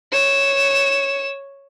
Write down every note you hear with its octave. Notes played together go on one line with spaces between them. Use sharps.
C#5 E7